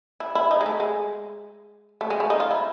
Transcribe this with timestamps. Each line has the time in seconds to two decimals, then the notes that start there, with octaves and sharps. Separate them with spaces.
0.20 E4
0.35 E4
0.51 D#4
0.61 G#3
0.66 A3
0.80 G#3
2.01 A3
2.10 G#3
2.20 A3
2.30 D#4
2.40 F4
2.51 E4